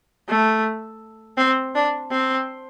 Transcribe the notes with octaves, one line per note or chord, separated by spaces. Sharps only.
A3
C4
D4
C4